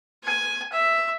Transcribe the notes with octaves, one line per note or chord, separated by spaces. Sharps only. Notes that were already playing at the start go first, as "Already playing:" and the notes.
G#5
E5